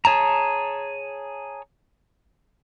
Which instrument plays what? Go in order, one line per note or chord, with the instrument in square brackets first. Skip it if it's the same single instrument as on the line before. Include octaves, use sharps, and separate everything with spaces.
[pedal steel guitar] G#4 C#5 A5 A#5